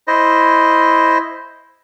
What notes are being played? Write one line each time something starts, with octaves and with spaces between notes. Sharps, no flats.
E4 C5 D#5